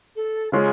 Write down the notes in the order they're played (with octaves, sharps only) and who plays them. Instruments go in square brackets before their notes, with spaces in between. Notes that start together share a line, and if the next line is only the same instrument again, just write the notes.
[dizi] A4
[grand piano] C#3 G#3 C#4 F4 [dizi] G#4 A4